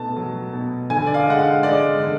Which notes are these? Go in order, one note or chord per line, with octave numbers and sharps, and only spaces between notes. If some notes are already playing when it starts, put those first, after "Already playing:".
Already playing: B2 A3 A5
F#3
B2
D3 G#5
D5
F5
G#3 F#5
F5
G#3 D5
D3